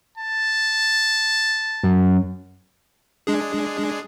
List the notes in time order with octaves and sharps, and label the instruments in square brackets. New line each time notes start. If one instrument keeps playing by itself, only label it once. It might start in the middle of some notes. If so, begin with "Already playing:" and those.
[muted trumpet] A5
[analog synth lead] F#2
[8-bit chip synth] G#3 D4 G#4